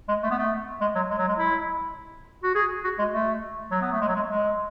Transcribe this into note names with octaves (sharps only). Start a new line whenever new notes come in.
G#3
A3
B3
A3
G#3
F#3
G#3
F#3
G#3
E4
F#4
G#4
F#4
G#3
A3
F#3
B3
A3
G#3
F#3
G#3
G#3